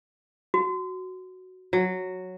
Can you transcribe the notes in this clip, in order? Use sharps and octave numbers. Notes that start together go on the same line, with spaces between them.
F#4
F#3